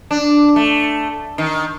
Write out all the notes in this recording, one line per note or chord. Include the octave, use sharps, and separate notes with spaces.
D4
A3
D#3